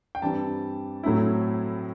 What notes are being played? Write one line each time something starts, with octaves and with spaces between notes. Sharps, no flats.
G5
G2 E3 G3 C4 A5
A2 F#3 A3 C4 E4